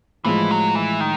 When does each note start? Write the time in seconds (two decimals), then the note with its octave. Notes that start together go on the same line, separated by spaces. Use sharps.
0.25 A2 E3 F3 G#3
0.51 F#3
0.75 E3
1.00 D#3